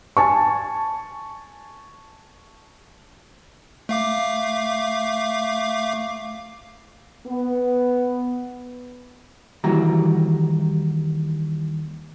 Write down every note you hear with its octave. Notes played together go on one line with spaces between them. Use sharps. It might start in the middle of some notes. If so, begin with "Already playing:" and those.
G#5 A5 C#6
A3 F5 D6
B3
D#2 E3 G3 F#4 A#5